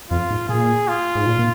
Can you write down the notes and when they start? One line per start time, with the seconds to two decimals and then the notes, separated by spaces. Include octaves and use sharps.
0.10 F2 F4
0.31 G#2
0.49 A#2 G#4
0.88 F4
1.15 G#2
1.27 A#2
1.39 A#2